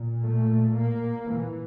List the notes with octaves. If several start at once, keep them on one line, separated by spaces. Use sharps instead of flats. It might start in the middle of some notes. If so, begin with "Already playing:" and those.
Already playing: A#2
A3
A#3
E3